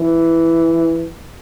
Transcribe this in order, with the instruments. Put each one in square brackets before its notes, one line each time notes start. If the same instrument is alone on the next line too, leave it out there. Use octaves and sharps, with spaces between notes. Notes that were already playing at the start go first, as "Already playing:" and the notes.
Already playing: [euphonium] E3